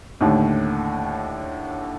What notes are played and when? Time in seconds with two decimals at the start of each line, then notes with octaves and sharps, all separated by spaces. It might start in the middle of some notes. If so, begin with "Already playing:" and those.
0.21 D#2 A2 D3